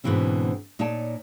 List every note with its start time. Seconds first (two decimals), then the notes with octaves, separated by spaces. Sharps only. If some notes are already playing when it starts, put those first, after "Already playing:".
0.04 G#2 B2 D3 E3 C4 C#4
0.79 A#2 D#4 C#5 D5 A5